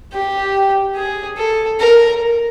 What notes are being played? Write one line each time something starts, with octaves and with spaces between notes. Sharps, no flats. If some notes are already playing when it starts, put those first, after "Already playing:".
G4
G#4
A4
A#4